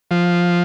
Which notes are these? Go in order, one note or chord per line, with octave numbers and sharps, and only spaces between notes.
F3